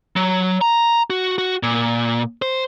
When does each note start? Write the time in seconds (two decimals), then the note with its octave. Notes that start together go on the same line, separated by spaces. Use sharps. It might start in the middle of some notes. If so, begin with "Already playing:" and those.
0.16 F#3
0.61 A#5
1.10 F#4
1.38 F#4
1.63 A#2
2.42 C5